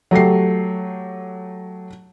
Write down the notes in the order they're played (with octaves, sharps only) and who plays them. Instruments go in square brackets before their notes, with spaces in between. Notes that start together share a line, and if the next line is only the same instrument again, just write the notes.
[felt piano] F#3 A3 G4 C7